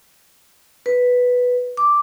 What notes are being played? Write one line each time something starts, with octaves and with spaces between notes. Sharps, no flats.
B4
D6